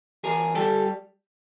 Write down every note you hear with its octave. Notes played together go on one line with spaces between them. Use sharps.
E2 G#4 A#4
G3 G4 A4